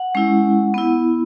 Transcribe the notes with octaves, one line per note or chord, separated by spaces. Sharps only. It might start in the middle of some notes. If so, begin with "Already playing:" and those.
Already playing: F#5
G#3 C#4 E4
B3 E4